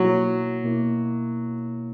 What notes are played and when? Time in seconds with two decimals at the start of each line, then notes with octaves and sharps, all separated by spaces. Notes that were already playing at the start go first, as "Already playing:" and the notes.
Already playing: B2 F#3 A#3 E4
0.64 B2 A#3 E4